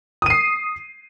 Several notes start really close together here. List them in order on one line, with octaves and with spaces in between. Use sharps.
D#6 D#7 C7